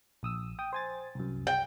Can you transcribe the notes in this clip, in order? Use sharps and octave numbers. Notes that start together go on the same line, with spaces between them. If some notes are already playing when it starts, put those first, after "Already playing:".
A#1 D#6 E6
G5 D#6
C5 G#5 A6
C2 F#2
G5